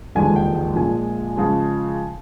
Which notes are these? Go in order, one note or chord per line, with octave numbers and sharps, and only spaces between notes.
E1 D#2 D3 F3 G#3 G#5
G5
G5
A#1 A#2 F3 G#3 G#5
C#3 F3 G#3